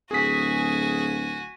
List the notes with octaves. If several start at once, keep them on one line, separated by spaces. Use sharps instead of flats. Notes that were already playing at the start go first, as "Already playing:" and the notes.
D1 F#4 G#4 G#5 B6